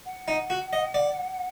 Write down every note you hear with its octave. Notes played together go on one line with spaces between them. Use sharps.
F#5
D#4
F#4
D#5
D5